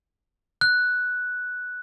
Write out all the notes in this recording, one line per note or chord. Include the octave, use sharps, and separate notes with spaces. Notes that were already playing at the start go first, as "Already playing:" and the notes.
F#6